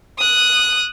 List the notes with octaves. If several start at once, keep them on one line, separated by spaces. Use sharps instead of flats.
D#6 F#6